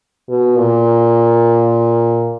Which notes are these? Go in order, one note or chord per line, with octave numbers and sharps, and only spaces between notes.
B2
A#2